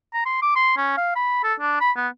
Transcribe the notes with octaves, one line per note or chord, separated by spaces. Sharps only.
A#5
C6
D6
C6
C#4
F5
B5
A4
D4
B5
B3